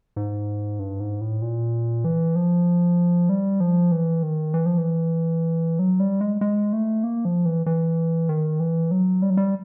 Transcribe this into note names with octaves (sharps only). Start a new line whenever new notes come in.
G#2
G2
G#2
A2
A#2
E3
F3
G3
F3
E3
D#3
E3
F3
E3
F#3
G3
G#3
G#3
A3
A#3
F3
E3
E3
D#3
E3
F#3
G3
F#3
G3